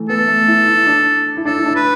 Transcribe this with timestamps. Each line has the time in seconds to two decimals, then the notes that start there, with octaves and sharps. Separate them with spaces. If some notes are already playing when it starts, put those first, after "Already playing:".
Already playing: E3 A3
0.09 B3 A4
0.28 A3
0.48 E4
0.67 E4
0.87 D4
1.37 E4
1.45 D4 A4
1.58 E4
1.66 D4
1.75 B4